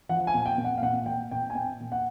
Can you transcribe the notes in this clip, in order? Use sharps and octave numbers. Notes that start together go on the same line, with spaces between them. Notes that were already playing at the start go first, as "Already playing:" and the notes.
F3 F#5
G#5
A#2
G5
A#2
F#5
F5
A#2 F#5
A#2 G5
A#2 G5
G#5
A#2 G5
A#2
F#5